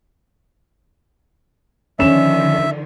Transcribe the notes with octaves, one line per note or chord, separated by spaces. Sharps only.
D3 D#3 F3 C#4 E5 E7